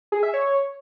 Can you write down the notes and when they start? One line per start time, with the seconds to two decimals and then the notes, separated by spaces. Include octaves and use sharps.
0.12 G#4
0.23 E5
0.34 C#5